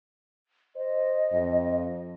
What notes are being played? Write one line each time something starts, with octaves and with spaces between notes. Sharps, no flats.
C5 D#5
F2